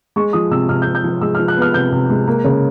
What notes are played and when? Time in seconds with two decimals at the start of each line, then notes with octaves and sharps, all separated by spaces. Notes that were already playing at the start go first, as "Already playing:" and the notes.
0.16 G#3 C#6
0.33 F3 D#6
0.51 C3 E6
0.69 C3 F6
0.82 G6
0.87 C3
0.95 G6
1.04 F3
1.21 G#3 E6
1.35 F6
1.39 F3
1.48 F#6
1.57 B3 F6
1.74 C3 G6
1.92 C3
2.10 G#3
2.27 A#3
2.44 C#3